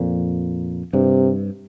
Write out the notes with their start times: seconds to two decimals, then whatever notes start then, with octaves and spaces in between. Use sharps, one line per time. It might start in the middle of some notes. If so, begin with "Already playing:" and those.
Already playing: F2 A#2
0.93 G2 C3